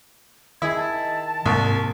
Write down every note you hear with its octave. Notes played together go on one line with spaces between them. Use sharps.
D#3 E4 G#4 D#5 G#6
A5
C2 G#2 A#3 C#6
G#2